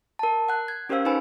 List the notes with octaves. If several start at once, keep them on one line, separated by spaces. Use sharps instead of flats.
A#4 A5
F#5 F#6
G#6
C#4 G4 A#4 C5 F5 E6
D#4 B4 C5 G#5 B5